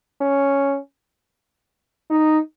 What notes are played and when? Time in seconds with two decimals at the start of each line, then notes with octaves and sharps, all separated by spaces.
0.21 C#4
2.10 D#4